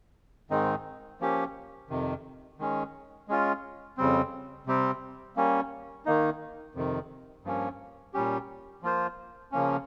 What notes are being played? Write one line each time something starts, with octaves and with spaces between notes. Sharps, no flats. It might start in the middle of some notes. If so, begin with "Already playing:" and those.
G#2 D#3 G#3 C4 D#4
F3 A#3 C#4 G4
F2 C3 D#3
D#3 G#3 C#4
G#3 C#4 F4
F2 C#3 G3 C4
C3 G3 C4 G4
G3 A#3 C#4
D#3 A#3 D#4
F2 C3 D#3
G2 F3 A#3 C#4
A#2 G3 C#4 G4
F3 A#3 F4 C5
C#3 F3 A#3 C#4